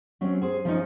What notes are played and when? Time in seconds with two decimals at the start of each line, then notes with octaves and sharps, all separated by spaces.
0.21 F#3 C4 C#4
0.42 G#4 C5
0.65 F3 C#4 D#4